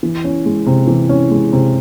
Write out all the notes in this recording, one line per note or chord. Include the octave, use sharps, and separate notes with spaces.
E3
C#4
G#3
C3
E3
C#4
G#3
C3